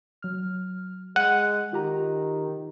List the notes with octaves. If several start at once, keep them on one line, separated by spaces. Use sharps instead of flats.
F#3 F6
G#3 F#5 D#7
D#3 F4 G4 A#5